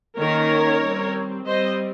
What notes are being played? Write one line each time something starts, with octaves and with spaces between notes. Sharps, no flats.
D#3 A#3 C#4 A#4 C#5
G3 C4
G3 C4 C5 D#5